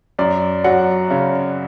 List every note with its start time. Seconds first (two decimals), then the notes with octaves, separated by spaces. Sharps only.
0.19 F#2 D5
0.64 F#3 F#5
1.11 C#3